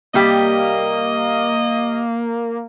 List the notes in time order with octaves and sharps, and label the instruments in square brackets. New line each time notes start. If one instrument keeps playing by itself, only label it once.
[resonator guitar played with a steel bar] C3 G3 G4 [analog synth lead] A#3 [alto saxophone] D#5